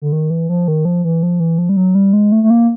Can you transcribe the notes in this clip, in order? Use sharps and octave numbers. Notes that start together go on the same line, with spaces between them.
D3
D#3
E3
F3
D#3
F3
E3
F3
E3
F3
G3
F#3
G3
G#3
A3
A3
A#3